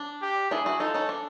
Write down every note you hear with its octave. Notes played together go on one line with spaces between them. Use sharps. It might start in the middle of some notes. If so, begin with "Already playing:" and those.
Already playing: D4
G4
D4 E4 G#4
E4 F#4
D#4 F4 A4
C#4 D#4
D4